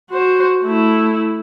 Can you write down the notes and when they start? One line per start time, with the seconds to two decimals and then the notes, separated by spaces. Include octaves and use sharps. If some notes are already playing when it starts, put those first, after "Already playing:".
0.11 F#4 C5
0.64 A3 E4